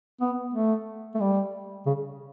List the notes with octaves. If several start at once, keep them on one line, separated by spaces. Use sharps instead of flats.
B3
A3
A3
G3
C#3